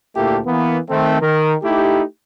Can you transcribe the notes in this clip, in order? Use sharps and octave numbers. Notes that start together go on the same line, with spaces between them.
D2 A#2 A3 A#3 E4 G4
E3 A#3 B3
D#3 A3 C4
D#3 A#4
A3 D#4 E4 G4